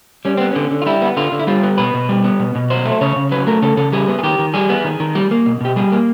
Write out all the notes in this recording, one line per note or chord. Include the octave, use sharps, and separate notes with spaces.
G3 C#4
B3 C4
D3 C#4
D3
F4
G3 E4
B3
D3 F4
D3
E4
G3 F4
B3
B2 B4
B2
G3
B3
B2
B2
F#3 C5
A3
C5
C#3 C#5
C#3
F#3 B4
A3 A#4
C#3 A4
C#3 A4
G3 G#4
B3
G#4
D#3 G4
D#3
G3 G#4
B3
D#3
D#3
G3
A#3
B2
B2 G4
G3 G#4
A#3